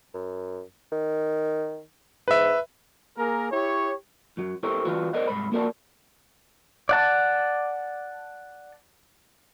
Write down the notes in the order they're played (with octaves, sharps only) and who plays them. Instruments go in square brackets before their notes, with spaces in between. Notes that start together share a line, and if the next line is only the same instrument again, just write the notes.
[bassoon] F#2
D#3
[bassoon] G#2 [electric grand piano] B4 E5
[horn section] A#3 G#4 A#4
E4 G4 C#5
[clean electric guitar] F#2 F#3
E4 G4 A4 A#4 C5 C#5
E3 G3 F4 F#4 B4
A#4 C5 D5 D#5 F#5
C2 G#2 B5
A#3 F#4 A#4 D5 A5
[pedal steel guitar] D5 F#5 A5